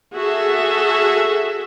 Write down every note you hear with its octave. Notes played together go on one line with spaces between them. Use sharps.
F#4 G#4 A4 E5